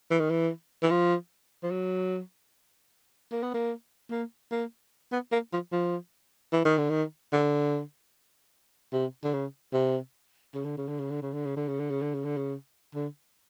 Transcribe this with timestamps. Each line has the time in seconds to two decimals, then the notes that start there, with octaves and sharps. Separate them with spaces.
0.10 E3
0.20 D#3
0.30 E3
0.82 E3
0.90 F3
1.63 F3
1.71 F#3
3.32 A#3
3.43 B3
3.54 A#3
4.11 A#3
4.51 A#3
5.12 B3
5.32 A#3
5.53 F3
5.72 F3
6.52 E3
6.65 D#3
6.78 D3
6.90 D#3
7.32 D3
8.93 C3
9.24 D3
9.33 C#3
9.73 C3
10.54 C#3
10.65 D3
10.77 C#3
10.88 D3
10.99 C#3
11.10 D3
11.22 C#3
11.33 D3
11.45 C#3
11.56 D3
11.68 C#3
11.79 D3
11.90 C#3
12.02 D3
12.14 C#3
12.24 D3
12.37 C#3
12.95 D3